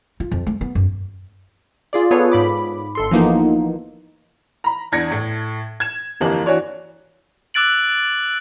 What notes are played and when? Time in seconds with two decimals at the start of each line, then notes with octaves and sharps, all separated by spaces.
0.20 F4
0.31 F2
0.46 A3
0.61 B3
0.75 F#2
1.93 F4 G#4 D5
2.11 B3 F4 G#4 A4 B4 C#5
2.32 G#2 B5 D6
2.95 G1 A4 C6
3.11 E3 F3 A#3 B3 D#4
4.64 A#5 B5
4.92 E2 D4 G#6 A#6 C#7
5.11 A2
5.80 G#6 E7
6.21 G1 F2 E3 A#3 G4 F#7
6.46 E3 D4 F#4 C#5 D5
7.54 D6 E6 F#6 A6 D7 F#7